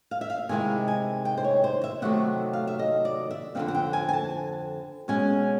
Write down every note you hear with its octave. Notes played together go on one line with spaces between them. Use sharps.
F5
E5
F5
C3 D#3 G#3 C4 E4 G#5
G#5
G5
C5
C#5
C5
E5
C3 D#3 F#3 A3 F#5
F5
E5
D#5
D5
E5
F2 D3 F3 A3 C4 F5
F#5
G5
G#5
G#5
A5
B2 G#3 C#4 G#5